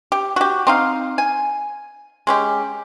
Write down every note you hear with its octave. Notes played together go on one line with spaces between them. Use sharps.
G4
F#4 G4
C4 D#4 F5
G#5
G#3 C#4 G4